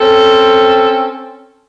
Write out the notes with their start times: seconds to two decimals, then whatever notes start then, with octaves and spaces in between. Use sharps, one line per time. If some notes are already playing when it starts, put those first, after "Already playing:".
0.01 C4 C#4 A4